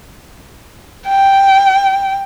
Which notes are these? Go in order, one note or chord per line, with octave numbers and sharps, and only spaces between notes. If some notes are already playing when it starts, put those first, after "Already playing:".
G5